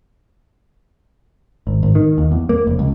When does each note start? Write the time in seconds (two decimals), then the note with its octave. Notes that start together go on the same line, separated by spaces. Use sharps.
1.67 G#1
1.83 G#1
1.95 D#3
2.18 D#2
2.32 E2
2.49 A#3
2.67 F1
2.79 C#2